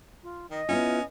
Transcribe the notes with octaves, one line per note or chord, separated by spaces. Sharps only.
F4
D#3 D#5
B3 C#4 E4 F4